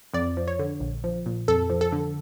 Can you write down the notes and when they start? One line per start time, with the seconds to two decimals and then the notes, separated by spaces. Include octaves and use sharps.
0.14 F2 D5
0.37 F3
0.48 C#5
0.59 D3
0.80 A#1
1.04 F3
1.26 A#2
1.48 F2 A4
1.70 F3
1.81 A4
1.92 D3